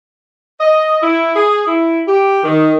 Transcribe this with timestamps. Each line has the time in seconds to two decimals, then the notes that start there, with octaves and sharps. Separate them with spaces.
0.60 D#5
1.02 E4
1.35 G#4
1.67 E4
2.07 G4
2.44 D#3